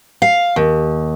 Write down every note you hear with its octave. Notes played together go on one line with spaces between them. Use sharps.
F5
D#2